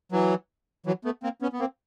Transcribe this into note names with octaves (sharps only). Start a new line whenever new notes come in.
E3 F#3
E3 F#3
A3 B3
A#3 C4
B3 C#4
B3
A#3 C4